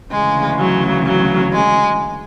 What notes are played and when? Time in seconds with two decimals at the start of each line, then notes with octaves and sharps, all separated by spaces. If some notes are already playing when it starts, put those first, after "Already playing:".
0.11 D2 C#3 E3 G#3
0.59 F#3
1.05 F#3
1.53 G#3